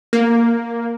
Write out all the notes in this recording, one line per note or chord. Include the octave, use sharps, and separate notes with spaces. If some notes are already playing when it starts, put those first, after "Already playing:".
A#3